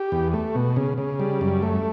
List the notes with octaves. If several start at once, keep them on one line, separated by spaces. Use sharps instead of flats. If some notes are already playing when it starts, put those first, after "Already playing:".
Already playing: G4
E2
A3
B2
C#3
C#3
G3
F#2
A3